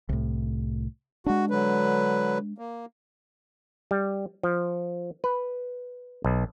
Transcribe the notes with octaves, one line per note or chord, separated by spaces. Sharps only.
C2 A2
G#3 D4 F#4
D3 F#3 B4
A#3
G3
F3
B4
B1